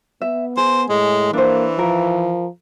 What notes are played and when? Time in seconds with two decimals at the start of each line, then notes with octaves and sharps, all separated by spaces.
0.22 B3 E5
0.57 G#4 C5
0.89 A2 G#3
1.33 E3 A#3 D4 C5
1.79 F3 A#4